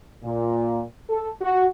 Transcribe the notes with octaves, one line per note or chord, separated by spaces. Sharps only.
A#2
A4
F#4